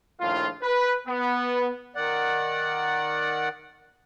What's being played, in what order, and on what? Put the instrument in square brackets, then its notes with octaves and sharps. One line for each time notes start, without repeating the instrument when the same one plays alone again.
[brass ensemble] A#1 A2 D#3 F4
B4
B3
[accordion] D#3 D5 F#5